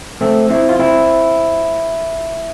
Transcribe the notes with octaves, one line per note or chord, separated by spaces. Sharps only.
A3 C4
C4 E4
F4
C4 E4